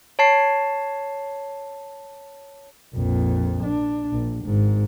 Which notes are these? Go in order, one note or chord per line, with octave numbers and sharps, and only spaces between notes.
C#5 A5 C7
A#1 F2
D4
A#1
G#1 G#2